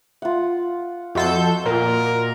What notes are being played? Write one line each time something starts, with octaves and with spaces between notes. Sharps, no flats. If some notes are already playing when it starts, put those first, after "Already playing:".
F4 F#5
F2 F#4 A4 D#5 C6 G6
A#2 A#4